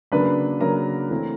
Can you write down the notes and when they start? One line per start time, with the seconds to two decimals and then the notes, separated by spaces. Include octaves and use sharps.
0.12 C#3 F#3 A#3 D4 B4 B5
0.61 C#3 F#3 A#3 D4 A#4 A#5
1.10 E3 A3 C4